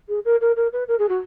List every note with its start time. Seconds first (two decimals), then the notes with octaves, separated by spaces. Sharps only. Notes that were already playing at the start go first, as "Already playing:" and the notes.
0.09 G#4
0.25 A#4
0.41 A#4
0.56 A#4
0.73 B4
0.88 A#4
0.99 G#4
1.09 F#4